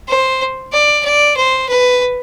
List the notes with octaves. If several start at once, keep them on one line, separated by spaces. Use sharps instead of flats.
C5
D5
D5
C5
B4